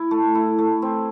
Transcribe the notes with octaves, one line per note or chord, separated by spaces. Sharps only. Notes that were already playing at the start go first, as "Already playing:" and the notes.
Already playing: E4
A3
E4
A3
C4